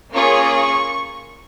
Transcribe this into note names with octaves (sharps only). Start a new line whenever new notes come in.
A#3 C#4 F4 G#4 C#6
C#6